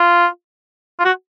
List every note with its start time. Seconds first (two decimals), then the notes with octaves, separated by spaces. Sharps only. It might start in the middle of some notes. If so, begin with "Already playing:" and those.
Already playing: F4
1.00 F4
1.05 F#4